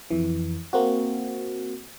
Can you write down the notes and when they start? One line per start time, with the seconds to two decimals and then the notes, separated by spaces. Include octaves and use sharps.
0.11 F2 E3
0.73 A#3 C4 F#4